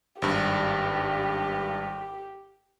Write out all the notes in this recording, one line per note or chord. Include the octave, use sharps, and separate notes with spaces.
G#1 G2 G4